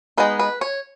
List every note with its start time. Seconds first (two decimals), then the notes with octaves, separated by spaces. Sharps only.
0.17 G#3 B3 D#4 B4
0.39 B4
0.61 C#5